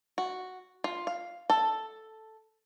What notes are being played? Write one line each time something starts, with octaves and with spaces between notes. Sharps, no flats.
F#4
F4
F5
A4